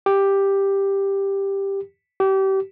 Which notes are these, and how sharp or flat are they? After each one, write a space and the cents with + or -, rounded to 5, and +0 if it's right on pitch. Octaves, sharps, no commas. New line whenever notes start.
G4 +5
G4 -30